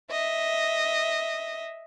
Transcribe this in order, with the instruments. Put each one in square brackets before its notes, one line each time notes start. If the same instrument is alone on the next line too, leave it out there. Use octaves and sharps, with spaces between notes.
[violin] D#5 E5